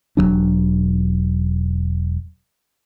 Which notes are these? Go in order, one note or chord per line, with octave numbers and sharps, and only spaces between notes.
E1 G2 F#3 D4